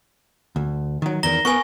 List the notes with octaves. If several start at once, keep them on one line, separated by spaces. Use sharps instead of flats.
D2
D#3 F#3
E2 D#3 A#4 A#5 A#6 G7
B3 A#4 B4 G#5 C#6